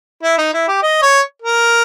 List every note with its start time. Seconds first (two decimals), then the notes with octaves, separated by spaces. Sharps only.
0.23 E4
0.38 D#4
0.54 E4
0.68 G4
0.83 D#5
1.02 C#5
1.42 A#4